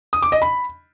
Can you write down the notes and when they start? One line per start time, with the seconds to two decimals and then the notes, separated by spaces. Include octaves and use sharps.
0.13 D#6
0.22 D6
0.32 D#5
0.42 B5